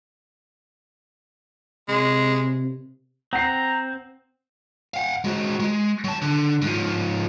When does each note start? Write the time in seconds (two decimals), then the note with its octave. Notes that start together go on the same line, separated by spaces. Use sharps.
1.88 C3 G#3
3.33 C4 F#5 A#5 C7
4.94 F5 F#5
5.24 G#3 F#4
5.60 G#3
6.04 F#3 A5
6.22 D3
6.62 G#2 F3